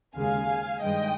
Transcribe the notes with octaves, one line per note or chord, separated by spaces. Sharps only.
D#2 C#3 G#3 F5 G#5
G2 D#3 G#3 D#5 G5